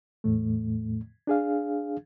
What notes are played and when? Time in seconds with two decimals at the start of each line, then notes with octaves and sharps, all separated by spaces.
0.24 E2 A2 A3
1.27 D4 G#4 F5